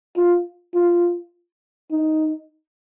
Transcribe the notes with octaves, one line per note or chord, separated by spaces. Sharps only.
F4
F4
D#4